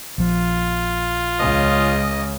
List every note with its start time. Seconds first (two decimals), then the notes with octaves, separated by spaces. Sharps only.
0.18 A#1 F3 F4
1.39 C#2 C#3 D#5